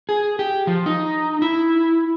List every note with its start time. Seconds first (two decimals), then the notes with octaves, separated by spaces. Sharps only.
0.09 G#4
0.39 G4
0.67 F3
0.86 D#4
1.42 E4